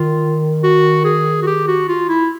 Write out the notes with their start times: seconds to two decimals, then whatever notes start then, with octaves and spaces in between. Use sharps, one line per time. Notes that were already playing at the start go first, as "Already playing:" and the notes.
Already playing: D#3 F4
0.64 F#4
1.05 G#4
1.43 F#4
1.47 G4
1.68 F#4
1.88 F4
2.09 E4